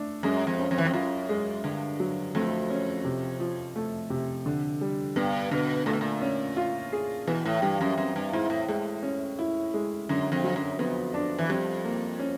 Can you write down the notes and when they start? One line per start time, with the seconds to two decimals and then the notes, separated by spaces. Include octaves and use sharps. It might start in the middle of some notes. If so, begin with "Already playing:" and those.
Already playing: A3 D4
0.23 F#2 G#3
0.47 F2
0.59 C#4
0.71 F2
0.78 E3
0.85 F2
0.94 F#2 F4
1.29 G#3
1.64 G2 D3
2.00 F#3
2.35 F2 A3
2.70 C#4
3.05 C3
3.40 F3
3.76 A3
4.10 C3
4.46 D3
4.81 G3
5.16 G2 B3
5.51 B2 D3
5.86 A#2 A3
5.93 B2
6.01 A#2
6.22 C#4
6.57 F4
6.93 G#4
7.27 B2 E3
7.45 A2
7.62 G2 G3
7.81 F#2
7.98 F#2 C4
8.16 G2
8.32 G#2 E4
8.50 A2
8.68 A2 G#3
9.03 C#4
9.39 E4
9.74 G#3
10.09 F#2 D3
10.32 F2
10.44 F#3
10.56 F#2
10.79 F2 B3
11.14 D4
11.39 E3
11.49 F2 G3
11.85 A#3
12.19 C#4